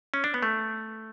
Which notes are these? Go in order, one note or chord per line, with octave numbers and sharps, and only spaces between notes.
C#4
D4
B3
A3